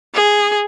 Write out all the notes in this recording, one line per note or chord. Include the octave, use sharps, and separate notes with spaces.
G#4